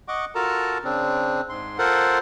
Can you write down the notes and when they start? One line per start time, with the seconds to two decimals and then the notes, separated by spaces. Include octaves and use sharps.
0.08 D#5 F#5 C#6 D6
0.35 F4 F#4 A4 A#4 A5 A#5
0.84 C#3 C4 D4
1.49 G#2 C6
1.78 F4 A4 A#4 C5 F#5